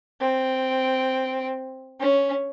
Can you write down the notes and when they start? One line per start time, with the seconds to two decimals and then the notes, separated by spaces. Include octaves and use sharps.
0.21 C4
2.00 C#4